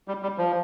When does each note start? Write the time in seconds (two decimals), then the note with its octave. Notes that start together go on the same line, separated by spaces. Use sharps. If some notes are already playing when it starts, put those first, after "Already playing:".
0.08 G3
0.23 G3
0.38 F3